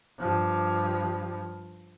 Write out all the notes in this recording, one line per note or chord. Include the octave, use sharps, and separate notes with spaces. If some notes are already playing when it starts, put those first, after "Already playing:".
G2 F3